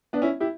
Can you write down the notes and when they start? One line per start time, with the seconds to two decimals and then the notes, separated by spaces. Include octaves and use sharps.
0.13 B3 D4
0.22 C#4 E4
0.40 E4 G4